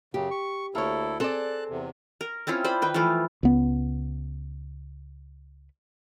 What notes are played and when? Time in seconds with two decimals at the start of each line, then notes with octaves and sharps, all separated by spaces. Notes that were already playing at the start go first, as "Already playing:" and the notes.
0.14 F#2 C#3 G4
0.31 C#6
0.75 D2 A#3 E4 A4 C#5
1.20 C4 G#4 A4 D5 A5 F#6
1.69 E2 C3
2.21 A#4
2.47 C4 C#4 E4 F4
2.64 C5 D5 B5
2.82 D#3 B4 G5
2.94 E3 F3 A3 F4
3.43 C#2 B3